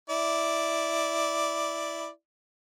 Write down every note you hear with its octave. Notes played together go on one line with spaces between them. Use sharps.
E4 D5